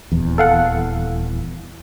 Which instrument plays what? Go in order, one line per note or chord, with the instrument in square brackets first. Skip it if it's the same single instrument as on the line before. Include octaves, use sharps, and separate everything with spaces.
[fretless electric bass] D#1 E2
[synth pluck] A4 F5 F#5